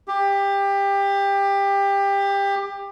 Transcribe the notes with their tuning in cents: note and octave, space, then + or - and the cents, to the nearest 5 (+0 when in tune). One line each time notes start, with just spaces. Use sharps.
G4 +20